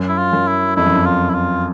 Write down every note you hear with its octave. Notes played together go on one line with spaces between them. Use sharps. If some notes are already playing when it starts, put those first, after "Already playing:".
Already playing: F#2
E4
F4
F#2
E4
F2 E4
F#2
F2
F4
E4
F4